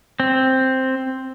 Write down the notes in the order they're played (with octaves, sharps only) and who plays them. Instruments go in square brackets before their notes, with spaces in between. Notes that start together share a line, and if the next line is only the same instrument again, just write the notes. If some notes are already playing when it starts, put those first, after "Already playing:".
[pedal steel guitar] C4